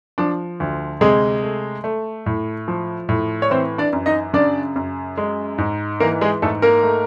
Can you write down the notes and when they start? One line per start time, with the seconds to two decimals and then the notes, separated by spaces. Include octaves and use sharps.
0.18 F3 D4
0.60 D2
1.01 C3 G#3 G#4
1.43 A3
1.84 A3
2.26 A2
2.68 F3
3.09 A2
3.42 C#5
3.50 E3 C4 C5
3.78 D4 D5
3.93 F#2
4.06 D#4 D#5
4.33 C#3 D4 D5
4.76 F#2
5.18 G#3
5.58 G#2
6.00 E3 A#3 A#4
6.21 G#3 G#4
6.42 G#2 A3 A4
6.62 A#3 A#4
6.83 A3